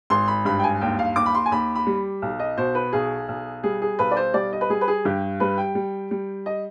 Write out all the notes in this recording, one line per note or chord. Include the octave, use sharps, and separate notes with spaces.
G#1 C6
B5
G2 B5
G5
G#5
D#2 G5
F5
D#2 D6
B5
C6
G#5
D#2 B5
B5
G3
B1
D#5
B2 C5
B4
B1 G#4
B1
G3 G#4
G#4
B1 B4
D5
C5
G3 D5
D#5
B4
G3 G#4
B4
G#4
G2 G4
G3 B4
G5
G3
G3
D#5